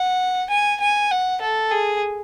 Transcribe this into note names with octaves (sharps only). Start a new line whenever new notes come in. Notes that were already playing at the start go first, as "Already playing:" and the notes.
Already playing: F#5
G#5
G#5
F#5
A4
G#4